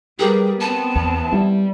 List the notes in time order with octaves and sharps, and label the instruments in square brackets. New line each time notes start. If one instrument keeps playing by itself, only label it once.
[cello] G3 [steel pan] G4 A#4 B4 [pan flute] G#4
[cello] B3 C4 [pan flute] A5
[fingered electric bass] E2
[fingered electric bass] G3 [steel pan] E4